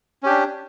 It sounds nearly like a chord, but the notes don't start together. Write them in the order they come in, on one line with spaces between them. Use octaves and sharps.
C#4 G4 D4